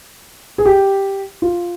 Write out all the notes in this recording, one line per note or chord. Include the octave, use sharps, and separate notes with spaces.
G#4
G4
F4